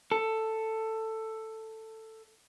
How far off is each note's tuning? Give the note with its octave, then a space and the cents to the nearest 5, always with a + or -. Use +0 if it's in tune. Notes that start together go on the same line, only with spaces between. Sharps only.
A4 +10